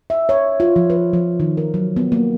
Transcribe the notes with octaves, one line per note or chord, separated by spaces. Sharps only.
E5
C#5
F4
F3
B4
F3
D#3
A#4
F#3
B3
A#3